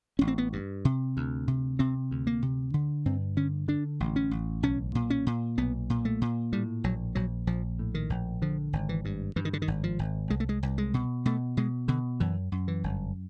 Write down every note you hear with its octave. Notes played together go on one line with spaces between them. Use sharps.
A1 C#4
C4
B3
G2
C3
D2
C3
C3 C4
D2
A#3
C3
D3
G2 C4
D3 C#4
D3 D4
A1
C#4
A1
B1 C#4
A#2
C#4
A#2
B1 B3
A#2
A3
A#2
A2 G3
A#1 F#3
A#1 F#3
A#1 F3
A2
D#3
A#1
D3 F3
G#1
E3
G2
G2 E3
D#3
D3
D#3
G#1
F3
G#1
C2 G#3
A3
G#3
C2
G#3
B2
B2 A3
B2 G#3
B2 D3
F#2 E3
F#2
E3
G1